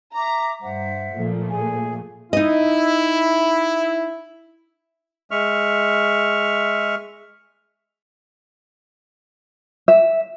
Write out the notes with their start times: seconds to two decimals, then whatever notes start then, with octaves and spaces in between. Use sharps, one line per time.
0.15 E5 A#5 D6
0.62 G2 C5 E5 F#5
1.15 A#2 F3 A3
1.49 G#4 G#5
2.33 D#4 E4 D#5
5.31 G#3 E5 C#6 F6
9.88 E5